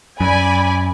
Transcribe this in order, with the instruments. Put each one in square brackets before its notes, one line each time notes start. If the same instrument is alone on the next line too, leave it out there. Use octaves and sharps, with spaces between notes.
[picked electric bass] F#2 [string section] D5 G#5 B5